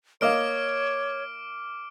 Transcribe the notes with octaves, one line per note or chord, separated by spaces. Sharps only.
A#3 C#5 D#5 F5 D6 F6 D7